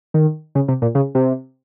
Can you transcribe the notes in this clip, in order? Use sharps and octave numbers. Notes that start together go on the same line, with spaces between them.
D#3
C#3
C3
A#2
C#3
C3